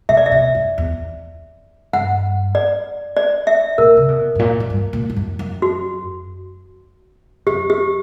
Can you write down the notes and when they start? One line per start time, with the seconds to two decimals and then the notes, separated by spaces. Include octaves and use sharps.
0.09 B2 E5
0.17 D5
0.26 E5
0.32 B2
0.55 F#2
0.78 E2
1.93 G2 F#5
2.55 D5
3.17 D5
3.47 E5
3.78 A#2 A#4
3.97 C#3
4.08 B2
4.35 G2
4.39 A#2
4.60 F#2
4.70 G2
4.93 A#2
5.10 G2
5.16 F#2
5.39 F#2
5.62 F#4
7.47 F#2 G4
7.70 G4